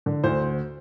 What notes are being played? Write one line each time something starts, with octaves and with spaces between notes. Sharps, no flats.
D3
D2 C5